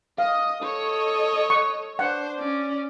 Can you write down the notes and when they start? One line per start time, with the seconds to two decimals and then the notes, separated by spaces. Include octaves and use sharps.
0.18 D#5 F5 D#6
0.63 A4 C#5 D#5
1.50 C#6
1.99 D4 C5 F#5
2.40 C#4 D5